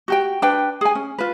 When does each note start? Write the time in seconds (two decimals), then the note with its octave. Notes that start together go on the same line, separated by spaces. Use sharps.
0.08 F#4 G4 G5
0.42 D4 B4 G5
0.81 G#4 G#5
0.95 C#4
1.18 F4 B4